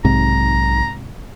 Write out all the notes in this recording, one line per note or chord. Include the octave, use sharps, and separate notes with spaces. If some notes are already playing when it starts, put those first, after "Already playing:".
B1 G#2 C3 A#5